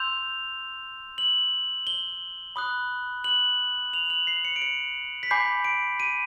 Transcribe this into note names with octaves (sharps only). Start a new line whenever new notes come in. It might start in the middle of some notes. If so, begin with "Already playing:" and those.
Already playing: C6 E6 G6 F7
F#7
G7
B5 D#6 F#6
F#7
F7
F#7
C7
C#7
D7
C#7
B6
G#5 B5 D6 G6 C7
D7
D#7